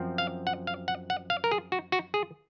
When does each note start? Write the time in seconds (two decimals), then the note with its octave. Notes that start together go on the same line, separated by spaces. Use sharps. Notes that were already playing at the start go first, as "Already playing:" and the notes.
Already playing: F#2 F3 C4
0.18 F5
0.47 F#5
0.67 F5
0.88 F#5
1.10 F#5
1.30 F5
1.44 A#4
1.52 G#4
1.72 F#4
1.92 F#4
2.14 G#4